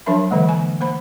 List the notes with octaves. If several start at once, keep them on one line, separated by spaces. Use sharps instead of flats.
F3 F#3 D4 A#4 E5 B5
D3 E3 G#3 A#3
G#5
A#3 C5 B5